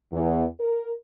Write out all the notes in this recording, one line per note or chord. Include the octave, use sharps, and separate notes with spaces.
E2
A#4